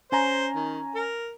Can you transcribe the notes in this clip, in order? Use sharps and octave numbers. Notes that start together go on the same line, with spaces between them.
C#4 C5 G#5 A#5
D#3
A#4